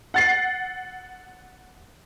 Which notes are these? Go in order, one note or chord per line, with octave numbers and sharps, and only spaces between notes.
F#5 A6 C7